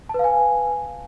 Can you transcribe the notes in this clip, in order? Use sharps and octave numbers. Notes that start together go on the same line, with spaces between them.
B4 F5 G#5 A5